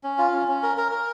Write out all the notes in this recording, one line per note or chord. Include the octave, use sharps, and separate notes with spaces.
C#4
F4
C#4
C#4
A#4
A#4
A#4